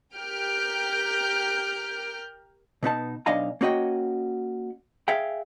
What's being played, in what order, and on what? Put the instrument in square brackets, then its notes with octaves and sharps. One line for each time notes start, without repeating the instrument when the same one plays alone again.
[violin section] G4 A#4 F6 G6 D7
[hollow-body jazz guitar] B2 B3 D#4 A5
B1 D4 D#5 F5 G#5 A#5
A#3 C#4 F#4 D#5 G5
G#4 E5 F5 G5